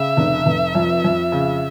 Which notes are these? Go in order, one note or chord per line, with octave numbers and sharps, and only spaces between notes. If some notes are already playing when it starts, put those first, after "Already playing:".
Already playing: C#3 E5
F1
F1
F2
F2
C#3